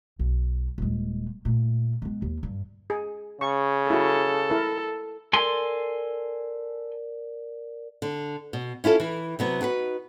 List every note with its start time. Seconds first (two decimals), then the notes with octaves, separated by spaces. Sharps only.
0.19 B1
0.78 D#1 G#3
1.45 A#2 A3
2.02 G#3 B3
2.22 D#2
2.43 G2
2.90 G#4
3.41 C#3 C#6
3.90 E4 F#4 A4
4.50 E4 A#4
5.33 A4 A#4 D5 G#5 C6
8.02 D3
8.53 B2
8.84 C#4 E4 F4 A4
9.00 E3 E4
9.39 C3 F#3 B3
9.61 D#4 F#4 G#4 B4